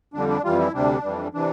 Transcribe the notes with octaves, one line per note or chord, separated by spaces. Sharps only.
F2 D3 G3 D4
D4
F2 E3 G3 F4
E4
D2 C3 G3 D4
F2 E3 G3
C3 E3 D4